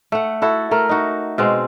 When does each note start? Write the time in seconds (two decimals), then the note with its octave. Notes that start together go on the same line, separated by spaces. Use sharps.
0.12 A3 F#5
0.42 E4 F#4 A4
0.71 A3 A#4
0.89 D#4 F#4
1.38 B2 G#3 C4